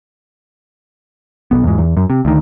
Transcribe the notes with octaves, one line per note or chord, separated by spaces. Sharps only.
B1 G2 B3
E2 G#2
E2
F#2
C3
D2 D#3